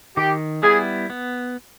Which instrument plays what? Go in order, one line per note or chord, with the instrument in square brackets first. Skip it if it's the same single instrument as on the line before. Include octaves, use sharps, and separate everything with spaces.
[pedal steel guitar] D#3 [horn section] G4
[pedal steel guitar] G3 B3 E4 [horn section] G#4
[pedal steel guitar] B3